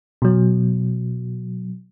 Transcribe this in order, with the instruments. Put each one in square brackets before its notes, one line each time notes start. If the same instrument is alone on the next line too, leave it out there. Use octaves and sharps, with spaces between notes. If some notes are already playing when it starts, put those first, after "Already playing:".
[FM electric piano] B2 F#3